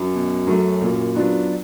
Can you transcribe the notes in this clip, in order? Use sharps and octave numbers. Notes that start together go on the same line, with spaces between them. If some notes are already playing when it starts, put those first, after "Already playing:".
Already playing: F#2
B2
F#3 A3 C#4
A#2
F#3 B3 D4 F4